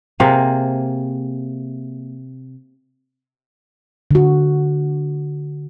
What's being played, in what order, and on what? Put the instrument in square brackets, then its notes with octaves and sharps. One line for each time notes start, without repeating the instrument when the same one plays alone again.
[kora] C3 A#3 G#4
[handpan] D3 F#4